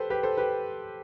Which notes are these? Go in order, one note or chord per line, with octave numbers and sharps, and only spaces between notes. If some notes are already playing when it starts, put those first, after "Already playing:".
Already playing: G4 A4 B4 C5
G4 B4
A4 C5
G4 B4